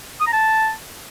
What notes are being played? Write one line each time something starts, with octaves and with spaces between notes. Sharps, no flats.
D#6
A#5
A5